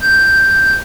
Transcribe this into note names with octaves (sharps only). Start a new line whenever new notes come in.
G6